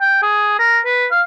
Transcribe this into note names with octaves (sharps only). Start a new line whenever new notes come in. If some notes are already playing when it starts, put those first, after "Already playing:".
G5
G#4
A#4
B4
F5